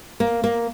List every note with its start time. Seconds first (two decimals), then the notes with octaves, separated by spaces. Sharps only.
0.20 A#3
0.44 A#3